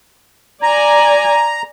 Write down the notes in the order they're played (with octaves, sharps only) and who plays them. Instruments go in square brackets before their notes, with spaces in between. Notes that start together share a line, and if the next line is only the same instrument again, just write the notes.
[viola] D5 G#5 [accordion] A#5